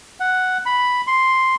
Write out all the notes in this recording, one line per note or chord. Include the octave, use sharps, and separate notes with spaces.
F#5
B5
C6